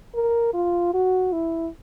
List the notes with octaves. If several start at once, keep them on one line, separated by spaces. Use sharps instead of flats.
A#4
F4
F#4
E4